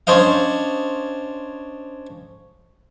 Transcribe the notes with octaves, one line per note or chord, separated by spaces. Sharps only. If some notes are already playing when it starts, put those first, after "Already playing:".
C#4 D4 C5 D#5 F5